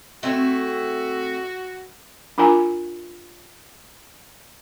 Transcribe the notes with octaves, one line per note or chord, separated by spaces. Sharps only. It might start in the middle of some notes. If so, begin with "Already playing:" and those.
A3 C4 E4 F#4
D4 F4 A#4 G#5 A#5